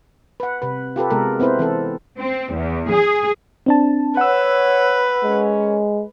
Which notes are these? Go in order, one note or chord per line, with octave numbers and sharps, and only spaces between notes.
B4 F#5
C3 B4
F4 G4 A4 B4
C3 G#3 B3 A4 A#4
B3 C4 E4 B4 C5
E3 C4 A4
C4
E2
G#4
C4 D4 A5
B4 C#5 F#5 E6
G#3 C#4 A#4 C#5